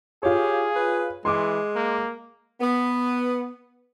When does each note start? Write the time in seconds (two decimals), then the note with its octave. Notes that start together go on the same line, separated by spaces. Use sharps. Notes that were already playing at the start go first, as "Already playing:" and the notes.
0.23 F4 G4 G#4 C#5
0.75 B4
1.25 E3 G#3 C6 D6
1.75 A#3
2.60 B3